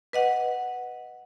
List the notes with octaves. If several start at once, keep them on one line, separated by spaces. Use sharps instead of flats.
B4 D#5 F#5